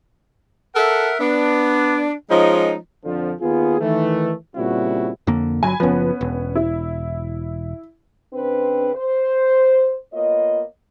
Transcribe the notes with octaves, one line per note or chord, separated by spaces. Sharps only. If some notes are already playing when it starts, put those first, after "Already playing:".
A4 A#4 E5 F#5
B3 D4
F3 G#3 C#4 D#4
F2 D3 F3
D#2 B3 F4 G#4
D#3 E3 A3
A#2 C#3 G3 C4 E4 F#4
F2 D3 A#3
G1 F#3 G#5 B5
F#1 F3 B3 C#4 B4
E1
E4
C#3 C4 D4 B4
C5
A#3 B3 F4 C#5 D#5